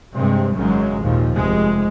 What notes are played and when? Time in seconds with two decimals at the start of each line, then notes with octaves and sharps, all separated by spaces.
0.16 G2 C3 G#3
0.54 G#1 F#2 C#3 F#3 G#3
1.01 D#2 A#2 F3
1.34 F1 C3 G#3